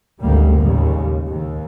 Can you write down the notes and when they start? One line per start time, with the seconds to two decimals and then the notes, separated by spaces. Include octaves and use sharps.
0.20 G#1 D2 G3 A#3
0.59 A1 D#2 C#3 G3 G#3
1.27 D#2